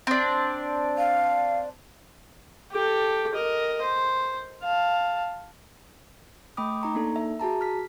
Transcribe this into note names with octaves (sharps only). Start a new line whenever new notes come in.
C4 D4
F5
G4 A4
A#4 D#5
C5
F5 A5
A3 G5 B5 D6 D#6
D#4 A#5 C#6
A#3 D4 D#4 A4
E5
F#4 G#4 A5 A#5
F6 B6